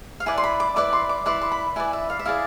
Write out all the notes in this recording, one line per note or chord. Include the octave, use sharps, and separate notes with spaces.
F5
E4 B4 D5 G#5
C6
B5
D6
E4 B4 D5 D6
C6
D6
E4 B4 D5 C6
C6
B5
E4 B4 D5 G#5
E5
F5
E5
E4 G#4 D5 F5